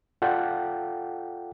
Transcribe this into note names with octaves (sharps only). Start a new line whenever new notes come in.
F4 A4 D5 F#5 G5